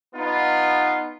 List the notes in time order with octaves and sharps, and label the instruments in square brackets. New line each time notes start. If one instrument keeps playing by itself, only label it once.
[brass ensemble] B3 D#4 F4